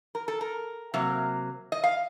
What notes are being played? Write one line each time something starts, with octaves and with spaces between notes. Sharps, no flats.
A#4
A4
A#4
C3 F#3 A#3
D#5
F5